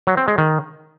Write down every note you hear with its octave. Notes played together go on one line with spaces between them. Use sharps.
F#3
C4
G#3
D#3